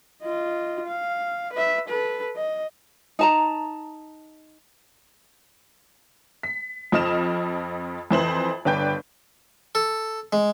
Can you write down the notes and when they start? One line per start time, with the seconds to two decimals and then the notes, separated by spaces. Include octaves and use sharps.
0.23 F4 D#5
0.87 F5
1.53 B4 E5
1.88 A4 B4
2.36 D#5
3.19 D#4 A5 A#5
6.43 B6
6.92 F2 F3 D#5 D#6 F6 E7
8.11 F2 E3 C5 F#7
8.65 G1 D4 B4 G5 G6
9.75 A4
10.33 G#3